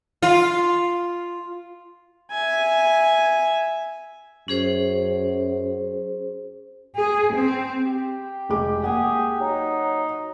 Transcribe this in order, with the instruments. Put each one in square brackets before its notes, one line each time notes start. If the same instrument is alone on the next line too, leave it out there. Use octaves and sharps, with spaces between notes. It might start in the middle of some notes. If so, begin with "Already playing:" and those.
[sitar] F4
[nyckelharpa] E5 G#5
[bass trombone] F#2 [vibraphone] C#4 G#4 C5
[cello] G#4
C4
[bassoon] G4
[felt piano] F1 G#3 D6
[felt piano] A#3 F#5 [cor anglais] G#4
[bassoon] F#3 [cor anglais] D#4